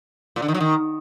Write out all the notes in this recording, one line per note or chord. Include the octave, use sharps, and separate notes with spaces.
A#2
D3
D#3
F#3
D#3